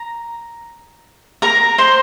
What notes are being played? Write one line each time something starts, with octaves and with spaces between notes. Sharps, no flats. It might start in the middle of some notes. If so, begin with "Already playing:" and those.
Already playing: A#5
A#4 A#5
C5 C6